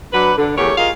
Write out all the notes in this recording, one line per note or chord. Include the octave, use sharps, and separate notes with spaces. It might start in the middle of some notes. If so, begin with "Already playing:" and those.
F#3 D4 B4
D3
E2 A3 G4 A#4 C#5
F4 G#4 A#4 D#5 F5